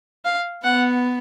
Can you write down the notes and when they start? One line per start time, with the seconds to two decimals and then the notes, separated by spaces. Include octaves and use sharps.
0.25 F5
0.64 B3 F#5